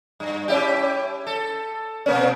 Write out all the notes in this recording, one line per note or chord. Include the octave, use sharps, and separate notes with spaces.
G2
C#4 E4 G4
A4
B2 A#3 C#4